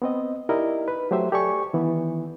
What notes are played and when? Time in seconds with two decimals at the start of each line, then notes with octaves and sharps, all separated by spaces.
0.02 B3 C4 D#5
0.49 D#4 E4 G4 A#4 D5 D#5
0.88 B4
1.11 F#3 A3 G4 C5 E5
1.32 G4 A4 D5 G#5 C#6
1.73 D#3 E3 B3